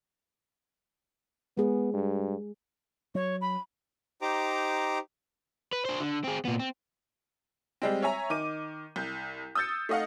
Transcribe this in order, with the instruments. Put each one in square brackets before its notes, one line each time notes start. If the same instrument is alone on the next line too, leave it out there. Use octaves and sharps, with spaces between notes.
[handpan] G#3 G#4 [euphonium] B3
[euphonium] G2
[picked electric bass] F#3 [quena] C#5
[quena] B5
[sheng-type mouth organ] D#4 G4 C5 A#5 D6
[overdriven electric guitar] B4
D4 C5
D3
C4 G#4
A#2 B3
C4
[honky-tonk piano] G3 G#3 C4
C#5 E5 G#5 A#5
D#3 D6 D#7
C2 G6
D#6 E6 G6 A6 C#7
A3 D#4 D#5 F5 F#5